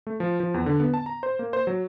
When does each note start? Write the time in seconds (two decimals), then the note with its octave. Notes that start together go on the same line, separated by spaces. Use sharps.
0.07 A3
0.20 F3
0.40 F3
0.54 E2
0.66 D3
0.80 B3
0.94 A5
1.06 A#5
1.23 C5
1.39 A#3
1.53 C5
1.67 F#3